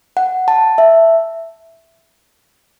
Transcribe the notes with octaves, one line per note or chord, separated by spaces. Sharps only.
F#5
A5
E5